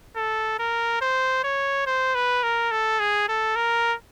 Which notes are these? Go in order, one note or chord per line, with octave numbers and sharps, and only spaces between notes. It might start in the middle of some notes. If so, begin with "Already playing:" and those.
A4
A#4
C5
C#5
C5
B4
A#4
A4
G#4
A4
A#4